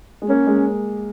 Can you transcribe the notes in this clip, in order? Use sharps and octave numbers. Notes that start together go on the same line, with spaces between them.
G#3
A#3 C#4
G#3